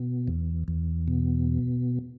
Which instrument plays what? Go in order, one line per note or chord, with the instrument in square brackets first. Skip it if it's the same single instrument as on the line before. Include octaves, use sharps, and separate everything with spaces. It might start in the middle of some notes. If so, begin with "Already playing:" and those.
Already playing: [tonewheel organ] B2
E2
E2
B2